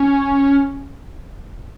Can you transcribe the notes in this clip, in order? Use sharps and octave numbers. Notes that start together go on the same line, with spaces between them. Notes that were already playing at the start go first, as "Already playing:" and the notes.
Already playing: C#4